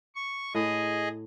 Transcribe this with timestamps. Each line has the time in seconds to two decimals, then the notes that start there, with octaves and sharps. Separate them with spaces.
0.15 C#6
0.55 A2 G#4 D#5